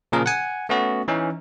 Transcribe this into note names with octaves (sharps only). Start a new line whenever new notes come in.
A#2 C#3 F3 G#4 A#4
F#5 G#5
A3 B3 C#4 F#4
E3 C#4 D#4